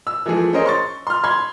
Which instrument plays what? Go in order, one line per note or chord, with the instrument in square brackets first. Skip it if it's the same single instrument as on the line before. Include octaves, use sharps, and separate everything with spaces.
[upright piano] E6
E3 F3 G#3 A3 G#4
C#4 G#4 A#4 C5 C#5 D#5
C6 C#6 A6
C6 F6
B5 C6 G#6